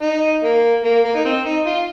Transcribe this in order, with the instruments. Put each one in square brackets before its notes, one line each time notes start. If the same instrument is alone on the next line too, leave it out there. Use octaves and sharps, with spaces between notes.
[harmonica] D#4
A#3
A#3
A#3
D#4
C4
D#4
F4